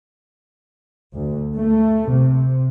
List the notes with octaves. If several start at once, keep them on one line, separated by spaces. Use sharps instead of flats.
D2
A3
C3